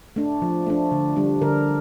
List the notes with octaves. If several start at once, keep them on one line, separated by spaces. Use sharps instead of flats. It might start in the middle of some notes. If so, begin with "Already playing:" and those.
A3 D4
F3
A3 D4
D3
G3 D4
D3 A#4